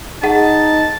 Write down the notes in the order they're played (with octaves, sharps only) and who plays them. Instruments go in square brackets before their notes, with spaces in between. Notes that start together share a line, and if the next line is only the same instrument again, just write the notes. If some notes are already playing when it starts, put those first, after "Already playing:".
[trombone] D#4 [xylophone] G#4 F#5 [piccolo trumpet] A5